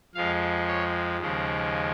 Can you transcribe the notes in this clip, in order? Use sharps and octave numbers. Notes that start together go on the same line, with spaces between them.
F2 F3 G#3 F5
C#5
D#2 C#3 F3 G#3